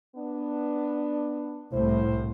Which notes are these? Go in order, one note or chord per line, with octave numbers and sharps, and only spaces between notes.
B3 D4
C2 A2 E4 C5